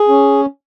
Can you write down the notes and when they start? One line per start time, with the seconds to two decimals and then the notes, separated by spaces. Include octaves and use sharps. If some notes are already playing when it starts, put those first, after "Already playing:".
Already playing: G#4
0.09 C#4